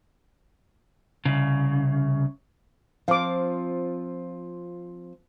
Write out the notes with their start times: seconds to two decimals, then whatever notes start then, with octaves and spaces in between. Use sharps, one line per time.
1.25 C2 C#3
3.08 F3 C4 F4 F5 D6